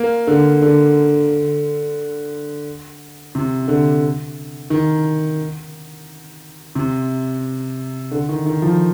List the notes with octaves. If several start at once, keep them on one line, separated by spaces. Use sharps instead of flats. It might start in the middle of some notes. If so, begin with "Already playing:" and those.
Already playing: A#3
D3
D3
C3
D3
D#3
C3
D3
D#3
D#3
F3